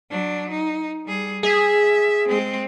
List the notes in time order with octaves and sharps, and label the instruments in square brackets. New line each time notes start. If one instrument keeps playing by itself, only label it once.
[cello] F#3 D4
D#4
G3 G#4
[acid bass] G#4 [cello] E5
[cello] G#3 C4